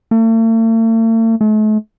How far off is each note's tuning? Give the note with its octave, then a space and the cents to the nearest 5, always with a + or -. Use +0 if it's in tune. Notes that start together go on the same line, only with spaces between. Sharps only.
A3 +45
A3 -40